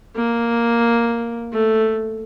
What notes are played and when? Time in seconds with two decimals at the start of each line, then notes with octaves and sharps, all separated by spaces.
0.15 A#3
1.52 A3